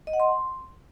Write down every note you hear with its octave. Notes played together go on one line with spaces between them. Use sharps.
D#5
F#5
C6